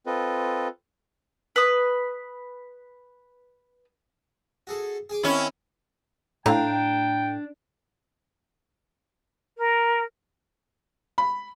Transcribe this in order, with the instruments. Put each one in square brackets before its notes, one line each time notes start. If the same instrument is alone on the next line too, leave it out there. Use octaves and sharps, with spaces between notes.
[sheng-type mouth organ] C4 F4 A4 B4 D#5
[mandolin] B4 D#6
[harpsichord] F#4 G#4 A4
G#4 G#5 D6
[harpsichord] D#3 C4 [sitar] C#4 E4
[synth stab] A2 [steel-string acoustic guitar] D4 [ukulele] F5 A#5 [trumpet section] G5
[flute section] A#4
[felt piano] B5